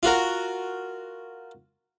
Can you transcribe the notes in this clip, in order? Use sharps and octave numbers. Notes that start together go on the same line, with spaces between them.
F4 F#4 A#4